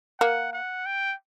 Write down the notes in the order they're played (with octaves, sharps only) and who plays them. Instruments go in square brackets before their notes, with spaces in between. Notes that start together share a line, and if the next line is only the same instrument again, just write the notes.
[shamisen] A#3 [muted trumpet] F#5
[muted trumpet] F#5
G5